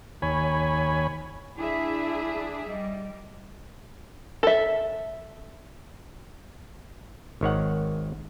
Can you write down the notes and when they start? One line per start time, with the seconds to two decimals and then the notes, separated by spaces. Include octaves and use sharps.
0.22 D#2 C#5 G#5 B5
1.57 D4 E4 G#4 E5
2.68 G3 D#5
4.43 A4 E5
7.41 G#1 D#3 C#5 F#5